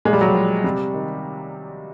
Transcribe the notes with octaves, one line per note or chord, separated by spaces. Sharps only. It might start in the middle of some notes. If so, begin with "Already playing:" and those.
A#2 G#3
G3
F#3
G3
F3
C3 G3
D#3